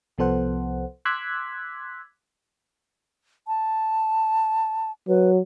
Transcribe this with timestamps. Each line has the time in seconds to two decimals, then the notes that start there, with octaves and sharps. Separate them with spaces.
0.18 C2 F3 B3 A4 C5 F#5
1.05 C6 D6 E6 F#6 G#6 B6
3.47 A5
5.08 F#3 B4